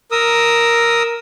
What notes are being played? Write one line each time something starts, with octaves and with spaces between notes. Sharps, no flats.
A#4 D#6 E6